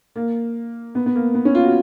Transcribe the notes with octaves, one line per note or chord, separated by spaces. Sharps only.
A#3
B3
B3
A#3
B3
C#4
F4
F#4